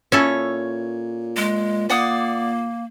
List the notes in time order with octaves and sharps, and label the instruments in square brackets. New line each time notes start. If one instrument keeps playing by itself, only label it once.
[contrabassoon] A#2 [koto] C#4 E4 A4 [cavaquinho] C#5
[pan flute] G#3
[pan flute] A#3 [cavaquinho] D5 F#5 D#6